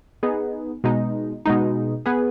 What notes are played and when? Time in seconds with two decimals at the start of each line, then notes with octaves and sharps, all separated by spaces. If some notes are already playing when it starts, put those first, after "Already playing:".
0.23 B3 D#4 G#4
0.84 B2 G#3 D#4
1.46 B2 G#3 D#4
2.06 B3 G#4 B4